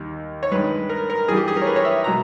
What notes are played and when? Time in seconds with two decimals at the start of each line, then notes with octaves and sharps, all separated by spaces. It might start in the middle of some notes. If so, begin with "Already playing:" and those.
Already playing: D#2 D#3 G3
0.43 C#5
0.52 G2 D#3 G#3 B4
0.89 A#4
1.10 A#4
1.28 G2 E3 G3 G#4
1.37 G4
1.48 G#4
1.56 A#4
1.62 C#5
1.67 B4
1.76 C#5
1.85 E5
2.04 B2 G#3 A#5